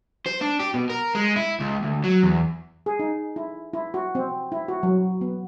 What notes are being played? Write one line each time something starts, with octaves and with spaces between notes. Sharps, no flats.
C5
D4
G4
B2
A#4
G#3
E4
C#2
D2
F#3
E2
G#4
D#4
E4
E4
F#4
C4
E4
F#4
F#3
B3